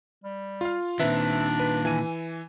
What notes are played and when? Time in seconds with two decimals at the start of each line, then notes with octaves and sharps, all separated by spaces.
0.24 G3
0.61 F4 F5
1.00 A#2 D#3 C4 D4 B4 E5
1.60 B4
1.85 E3 G#5 D#7